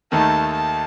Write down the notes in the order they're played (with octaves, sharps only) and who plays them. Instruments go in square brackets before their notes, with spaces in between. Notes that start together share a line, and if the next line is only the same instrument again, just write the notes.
[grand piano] D#2 D#3 A3 D#4 [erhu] A5
[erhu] A5